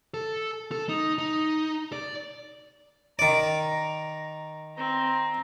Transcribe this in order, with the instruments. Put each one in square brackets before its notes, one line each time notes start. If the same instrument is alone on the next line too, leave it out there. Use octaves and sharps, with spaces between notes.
[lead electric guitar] A4
A4
D#4
D#4
D5
[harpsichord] D#3 D5 [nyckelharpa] A#5
[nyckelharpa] C4 A#5